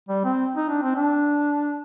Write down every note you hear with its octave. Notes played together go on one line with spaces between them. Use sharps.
G3
C4
D#4
D4
C4
D4